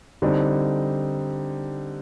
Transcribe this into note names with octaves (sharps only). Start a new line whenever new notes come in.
D3 G3 C4 D#4